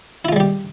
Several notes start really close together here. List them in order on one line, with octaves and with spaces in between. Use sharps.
E4 F4 G#3 G3 G4